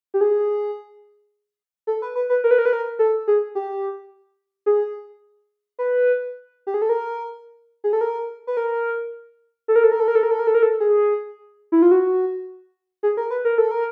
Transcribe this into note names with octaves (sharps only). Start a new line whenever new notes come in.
G4
G#4
A4
B4
B4
B4
A#4
B4
A#4
B4
A#4
A4
G#4
G4
G#4
B4
G4
G#4
A4
A#4
G#4
A4
A#4
B4
A#4
A4
A#4
A4
A#4
A4
A#4
A4
A#4
A4
A#4
A4
A#4
A4
G#4
E4
F4
F#4
G#4
A#4
B4
A#4
A4
A#4